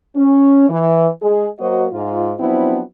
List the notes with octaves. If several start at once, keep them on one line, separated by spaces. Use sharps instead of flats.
C#4
E3
G#3 G#4
F#3 A#3 F#4 C5 D#5
G#2 F4
F3 F#3 B3 C4 D4 E4